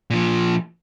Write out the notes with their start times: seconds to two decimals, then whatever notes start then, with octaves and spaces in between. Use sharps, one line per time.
0.10 A#2 F3